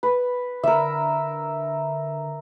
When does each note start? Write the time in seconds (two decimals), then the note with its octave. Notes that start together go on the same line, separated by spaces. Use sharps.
0.03 B4
0.63 D3 A#4 E5